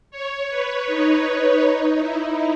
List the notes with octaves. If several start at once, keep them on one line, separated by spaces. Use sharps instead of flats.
C#5
B4
D#4
D#4
E4